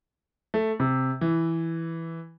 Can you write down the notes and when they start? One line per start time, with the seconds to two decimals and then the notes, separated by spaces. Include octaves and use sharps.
0.54 A3
0.80 C3
1.21 E3